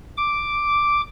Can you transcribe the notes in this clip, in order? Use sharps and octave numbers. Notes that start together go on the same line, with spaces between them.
D6